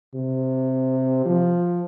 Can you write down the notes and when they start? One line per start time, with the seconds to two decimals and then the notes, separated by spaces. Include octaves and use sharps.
0.15 C3
1.26 F3